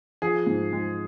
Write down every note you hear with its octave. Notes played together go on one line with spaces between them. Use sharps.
F3 G#4
G#2
G#3